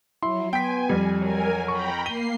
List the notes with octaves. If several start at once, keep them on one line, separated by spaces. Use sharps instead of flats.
F#3 E4 C6
B3 G5 G#5 B6
F2 G3
F#3 A#4 G#5
G5 A#5 B5 C#6
A#3 C7 D#7 G7